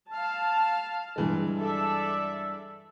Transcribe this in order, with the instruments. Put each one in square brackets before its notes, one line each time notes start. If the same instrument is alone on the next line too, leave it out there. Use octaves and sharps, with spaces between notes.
[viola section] F5 A5
[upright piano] G2 E3 G#3
[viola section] A4 D5 E5